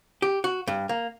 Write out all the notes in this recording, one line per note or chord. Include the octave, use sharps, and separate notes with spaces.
G4
F#4
G2
A#3